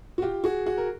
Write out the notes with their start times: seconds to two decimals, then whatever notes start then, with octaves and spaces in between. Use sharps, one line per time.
0.18 F#4
0.22 F4 G4
0.44 F#4 G#4
0.66 F#4 G#4
0.78 A#4